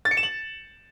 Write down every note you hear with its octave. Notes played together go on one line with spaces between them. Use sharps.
A6
C#7
E7
F#7